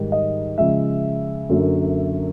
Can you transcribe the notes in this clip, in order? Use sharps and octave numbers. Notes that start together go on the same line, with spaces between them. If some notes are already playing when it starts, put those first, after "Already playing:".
Already playing: G#2 D#3 G3
D#5
C#3 F3 G#3 E5
F#2 D3 F#3 A#3